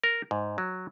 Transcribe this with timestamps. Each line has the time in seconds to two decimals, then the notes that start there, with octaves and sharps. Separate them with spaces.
0.04 A#4
0.31 G#2
0.58 F#3